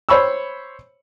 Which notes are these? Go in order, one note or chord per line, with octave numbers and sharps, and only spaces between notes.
C5 C#5 B5 C#6 E6